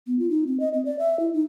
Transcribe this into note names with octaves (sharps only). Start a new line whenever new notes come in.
B3
F4
D#4
C4
D#5
C4
D5
E5
E4
D#4